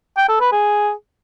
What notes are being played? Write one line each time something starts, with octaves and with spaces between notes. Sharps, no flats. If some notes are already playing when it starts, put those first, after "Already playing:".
G5
A4
B4
G#4